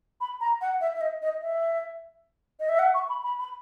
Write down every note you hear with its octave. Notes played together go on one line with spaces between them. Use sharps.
B5
A#5
F#5
E5
E5
D#5
D#5
E5
D#5
E5
F#5
C#6
B5
B5
B5